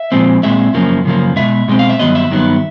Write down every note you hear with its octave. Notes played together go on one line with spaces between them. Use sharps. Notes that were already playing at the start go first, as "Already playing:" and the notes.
Already playing: E5
A#2 F3 G#3 C4
A#2 F3 G#3 C4 E5
F#2 C#3 F3 A#3
F#2 C#3 F3 A#3
B2 G#3 E5
B2 G#3 C4
F5
E5
G2 D#3 F#3 B3 D#5
E5
G2 D#3 F#3 B3